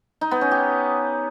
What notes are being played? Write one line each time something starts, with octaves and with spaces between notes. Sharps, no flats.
D#4
B3
C#4
G4